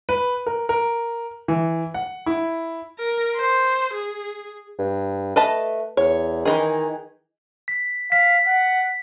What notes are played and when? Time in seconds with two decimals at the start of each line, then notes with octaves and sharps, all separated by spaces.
0.09 B4
0.46 A#4
0.69 A#4
1.48 E3
1.94 F#5
2.26 E4
2.99 A#4
3.36 C5
3.94 G#4
4.79 G2
5.36 A3 B4 D#5 A5
5.97 E2 C#5
6.45 D#3 E3 D#4 G#4
7.68 B6
8.12 F5 B6
8.47 F#5